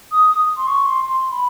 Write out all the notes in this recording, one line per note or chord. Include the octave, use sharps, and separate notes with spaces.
D#6
D#6
C6
C#6
C6
C6
B5